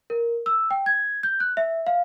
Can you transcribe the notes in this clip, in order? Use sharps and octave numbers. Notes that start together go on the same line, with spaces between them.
A#4
E6
G5
G#6
G6
F#6
E5
F5